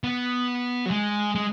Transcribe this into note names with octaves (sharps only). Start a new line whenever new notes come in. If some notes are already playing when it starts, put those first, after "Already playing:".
B3
F#3
G#3
G#3